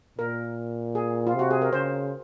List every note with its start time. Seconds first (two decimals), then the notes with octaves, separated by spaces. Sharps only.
0.18 A#2 A#4
0.95 G#4
1.27 F4
1.35 C3 F#4
1.51 G#4
1.62 A#4
1.73 C#3 C5